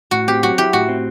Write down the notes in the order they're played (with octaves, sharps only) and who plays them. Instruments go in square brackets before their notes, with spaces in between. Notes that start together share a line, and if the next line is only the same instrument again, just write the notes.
[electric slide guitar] A2 [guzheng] F#4
[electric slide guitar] C4 [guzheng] G4
[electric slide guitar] F#3 [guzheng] F#4
[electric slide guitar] E4 [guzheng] G4
[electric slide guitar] A2 [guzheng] F#4
[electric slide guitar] C4